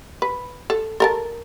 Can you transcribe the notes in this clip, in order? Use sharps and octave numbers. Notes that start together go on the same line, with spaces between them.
B4
A4
A4 A#4 A5